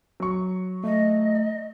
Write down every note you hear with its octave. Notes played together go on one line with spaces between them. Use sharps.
F#3 C#6
A3 D#5